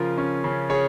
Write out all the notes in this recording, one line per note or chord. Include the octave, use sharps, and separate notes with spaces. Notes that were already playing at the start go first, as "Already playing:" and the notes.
Already playing: C#3 F3 F4 A#4
C#4
C#3
C#3 G#4 C#5